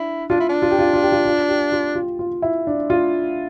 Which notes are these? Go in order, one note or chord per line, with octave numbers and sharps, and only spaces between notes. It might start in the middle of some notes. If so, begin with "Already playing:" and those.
Already playing: D4 E4
D4 F4
E4
D4
F4
G4
F4
F4
G4
F4
F4
G4
F4
F4
F4
E4
D4
F4